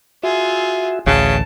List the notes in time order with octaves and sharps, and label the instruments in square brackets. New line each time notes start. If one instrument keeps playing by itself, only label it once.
[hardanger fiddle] F4 G#4 [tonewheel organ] F#4 E5
[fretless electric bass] A1 D2 [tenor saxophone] C#3 [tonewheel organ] G#5 B5 C#6 [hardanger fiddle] A5